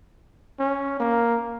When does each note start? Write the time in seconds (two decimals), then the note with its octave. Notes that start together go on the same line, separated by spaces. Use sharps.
0.60 C#4
1.00 A#3